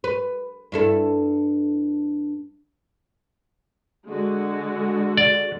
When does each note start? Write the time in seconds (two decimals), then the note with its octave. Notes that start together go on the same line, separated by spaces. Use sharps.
0.04 B4
0.72 G2 E4 A4
4.08 D3 G#3 F#4
5.17 D5